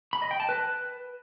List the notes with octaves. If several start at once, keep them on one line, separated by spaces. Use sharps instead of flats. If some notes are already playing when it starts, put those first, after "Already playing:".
B5
D#5
G5
A5
B4